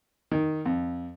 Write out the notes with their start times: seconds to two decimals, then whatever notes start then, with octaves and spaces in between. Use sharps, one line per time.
0.31 D#3
0.66 F2